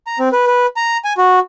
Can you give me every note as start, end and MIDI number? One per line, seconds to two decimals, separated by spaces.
0.07 0.18 82
0.19 0.29 60
0.32 0.47 71
0.47 0.66 71
0.77 0.97 82
1.05 1.13 80
1.17 1.39 66